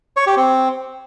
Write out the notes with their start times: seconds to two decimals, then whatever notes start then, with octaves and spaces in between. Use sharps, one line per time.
0.17 C#5
0.27 G4
0.37 C4